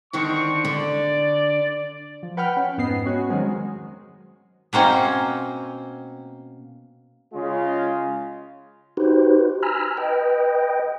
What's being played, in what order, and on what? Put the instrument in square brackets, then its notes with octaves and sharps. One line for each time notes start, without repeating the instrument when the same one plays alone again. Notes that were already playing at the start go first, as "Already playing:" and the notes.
[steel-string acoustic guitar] D3 D#3 D4 [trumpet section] C4 C#6
[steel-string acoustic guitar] D3 [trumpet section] D5
[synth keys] F3
B4 F#5 G5 B5 F6
C#4
F2 G#2 B3 D#5 C7
C#4 F#4
D#3 F#3 G#3 C4
[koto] B2 A#3 C4 C#4
[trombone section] C#3 G#3 F4
[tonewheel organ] D#4 F#4 G4 B4 C5
G#5 A#5 B5 E6 F6
B4 D#5 G5